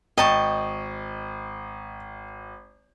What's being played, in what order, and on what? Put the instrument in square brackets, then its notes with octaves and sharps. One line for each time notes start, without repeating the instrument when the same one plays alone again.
[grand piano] G#1 [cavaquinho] D#5 A5 C#6 [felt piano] G5